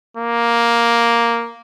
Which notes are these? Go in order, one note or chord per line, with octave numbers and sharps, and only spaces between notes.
A#3